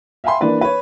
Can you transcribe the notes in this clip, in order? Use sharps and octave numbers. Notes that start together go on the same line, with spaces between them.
E5 F5 G5 G#5 B5 C6
E3 A#3 D4 B4 D5
B4 C#5